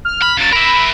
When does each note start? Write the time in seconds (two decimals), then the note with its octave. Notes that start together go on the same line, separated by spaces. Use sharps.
0.05 F6
0.22 B5
0.37 C#3 F#3 A6
0.53 A#4 E5 B5